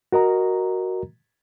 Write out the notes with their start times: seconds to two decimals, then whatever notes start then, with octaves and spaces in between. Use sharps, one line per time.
0.12 F#4 A#4 D#5 A#5